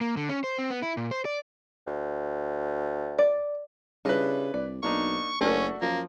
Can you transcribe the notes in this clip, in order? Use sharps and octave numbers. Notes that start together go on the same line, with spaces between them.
A#3
D3
C#4
C5
C4
B3
E4
A#2
C5
D5
D2
D5
C#3 G3 D4 E4 F4 B4 D#5
C2 D5
B1 A#3 D4 D#4 C#6
F#1 A3 C#4 D4 F#4 A#4
F#2 F3 A#3